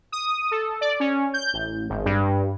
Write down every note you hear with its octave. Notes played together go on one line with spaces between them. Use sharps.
D#6
A4
D5
C#4
G6
A1
G#1
G2